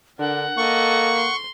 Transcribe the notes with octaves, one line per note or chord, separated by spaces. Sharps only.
D3 D4 A#4 F#5
A#3 A4 D#5 C#6
C6